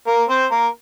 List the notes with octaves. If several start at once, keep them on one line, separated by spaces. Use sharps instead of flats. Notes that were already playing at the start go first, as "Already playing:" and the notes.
A#3 A#4
C4 C5
A#3 A#4